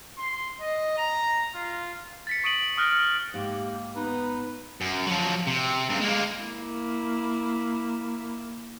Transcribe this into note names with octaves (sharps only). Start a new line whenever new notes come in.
C6
D#5
A#5
F4
A6 B6 C#7
C#6 D#6 D7 D#7 F#7
D#6 F6 F#6 A#6 C#7 D7
G#2 A#3 G4
B3 D#4 B4
F#2
F3 F#3
C3
G2 C#3
G#3 A#3
A#3 E4